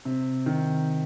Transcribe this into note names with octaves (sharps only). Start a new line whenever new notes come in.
C3
D#3